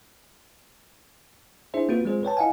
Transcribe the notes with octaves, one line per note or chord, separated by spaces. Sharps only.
D4 E4 G#4 C5 E5
A#3 C4 F4 F#4 B4
F#3 G#3 C4 F4 G#4 C5
B4 C#5 G5 A5
E4 D#5 F5 F#5 G#5